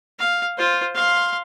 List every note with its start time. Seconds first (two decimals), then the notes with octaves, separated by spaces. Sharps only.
0.19 F5
0.57 F4 C5
0.95 F5 C6